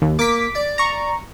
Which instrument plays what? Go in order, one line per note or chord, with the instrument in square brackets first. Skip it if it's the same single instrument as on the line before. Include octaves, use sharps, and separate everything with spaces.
[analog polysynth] D#2
[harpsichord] A#3 [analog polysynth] D6 B6
[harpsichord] D5
[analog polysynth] A#5 C#6